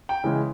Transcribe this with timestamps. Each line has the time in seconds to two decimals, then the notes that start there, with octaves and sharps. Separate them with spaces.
0.09 G5
0.24 C#3 E3 G#3